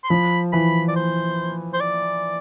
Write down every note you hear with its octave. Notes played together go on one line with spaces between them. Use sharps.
C6
F3 B5
E3 B5
D5
C5
C5
D5